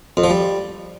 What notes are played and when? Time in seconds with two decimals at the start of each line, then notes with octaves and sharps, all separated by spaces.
0.17 F2
0.24 F3
0.30 G3